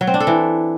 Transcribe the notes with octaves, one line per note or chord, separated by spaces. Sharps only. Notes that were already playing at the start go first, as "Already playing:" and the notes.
F#3
C4
D4
A4
E3